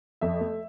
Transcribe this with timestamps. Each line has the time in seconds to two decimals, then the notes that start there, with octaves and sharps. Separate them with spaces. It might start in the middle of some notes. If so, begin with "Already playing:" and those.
0.21 F2 E5
0.41 A3